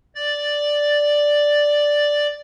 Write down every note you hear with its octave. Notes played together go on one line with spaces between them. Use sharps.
D5 A6